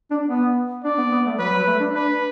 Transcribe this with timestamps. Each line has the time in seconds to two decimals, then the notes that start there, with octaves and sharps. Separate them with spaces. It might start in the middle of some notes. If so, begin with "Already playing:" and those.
0.11 D4
0.28 B3
0.84 D4 D5
0.98 B3
1.12 B3
1.26 A3
1.39 F#3 B4
1.53 F#3
1.67 A3
1.80 D4
1.94 D4 B4